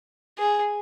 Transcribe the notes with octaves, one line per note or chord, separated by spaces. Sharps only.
G#4